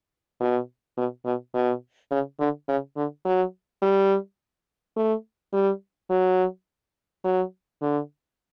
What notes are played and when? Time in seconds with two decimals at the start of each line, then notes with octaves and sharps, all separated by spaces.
0.40 B2
0.97 B2
1.25 B2
1.54 B2
2.11 C#3
2.40 D3
2.68 C#3
2.96 D3
3.25 F#3
3.82 G3
4.96 A3
5.53 G3
6.10 F#3
7.24 F#3
7.82 D3